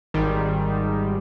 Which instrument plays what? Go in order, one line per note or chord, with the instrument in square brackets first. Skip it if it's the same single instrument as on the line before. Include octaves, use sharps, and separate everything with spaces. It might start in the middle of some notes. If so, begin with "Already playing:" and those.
[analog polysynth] G#1 G#2 D#3 G3